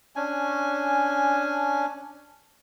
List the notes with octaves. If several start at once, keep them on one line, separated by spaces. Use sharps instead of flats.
C#4 D4 G#5